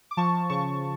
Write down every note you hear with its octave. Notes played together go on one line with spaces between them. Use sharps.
D6
F3 A5 C#6
C#3 A5 C#6